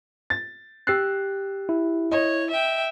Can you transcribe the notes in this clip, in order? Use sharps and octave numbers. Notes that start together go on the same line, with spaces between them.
A6
G4 E6 F#6 A6 C7
E4
C#5 D#5
E5 G5